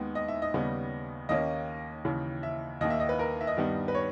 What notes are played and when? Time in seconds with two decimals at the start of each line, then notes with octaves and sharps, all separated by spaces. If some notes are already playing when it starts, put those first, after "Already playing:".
Already playing: D#2 D#3 G#3 B3
0.15 D#5
0.28 E5
0.42 D#5
0.54 D#2 C#3 G3 B3
1.29 D#2 D#3 A#3 C#4 D#5
2.05 D#2 C#3 E3
2.43 E5
2.81 D#2 D#3 A#3 D#5
2.90 E5
3.00 D#5
3.09 B4
3.19 A#4
3.41 E5
3.47 D#5
3.57 G2 D#3 G3 B3
3.88 B4
3.95 C#5